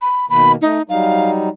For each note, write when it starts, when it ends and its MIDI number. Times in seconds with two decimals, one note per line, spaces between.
0.02 0.28 83
0.30 0.56 47
0.30 0.56 51
0.30 0.56 58
0.30 0.52 83
0.62 0.78 57
0.62 0.82 63
0.89 1.49 54
0.89 1.49 55
0.89 1.49 63
0.89 1.31 77